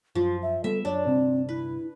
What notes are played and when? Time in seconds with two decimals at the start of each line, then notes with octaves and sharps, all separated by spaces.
0.15 F#2 F3 F4
0.43 E5
0.64 G3 B3 A4 E5
0.85 F#2 D4 C#5
1.07 G1 G2 C3 C4
1.49 E4 B4